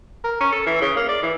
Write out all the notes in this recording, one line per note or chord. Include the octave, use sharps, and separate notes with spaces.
A#4
C#4
A4
E3
C#3
A#3
D5
E3